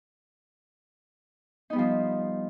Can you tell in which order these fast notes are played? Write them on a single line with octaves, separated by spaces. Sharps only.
D#4 B3 G3 F3